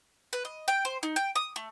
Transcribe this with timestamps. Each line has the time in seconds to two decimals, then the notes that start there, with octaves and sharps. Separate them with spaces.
0.33 B4
0.45 D#5
0.68 G5
0.85 C5
1.03 D#4
1.16 G5
1.35 D#6
1.56 A3